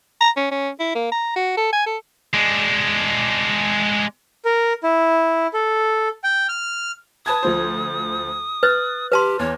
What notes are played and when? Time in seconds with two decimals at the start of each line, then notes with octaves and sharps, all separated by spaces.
0.21 A#5
0.37 C#4
0.51 C#4
0.80 E4
0.95 A#3
1.12 A#5
1.36 F#4
1.57 A4
1.73 G#5
1.86 A4
2.34 G#3 D4
4.45 A#4
4.84 E4
5.53 A4
6.24 G5
6.49 F6
7.26 B4 A5 D#6 G#6
7.43 D2 F3 C5
8.63 B4 F#6 A6
9.12 G4 B4 A5 C6
9.39 E2 C#5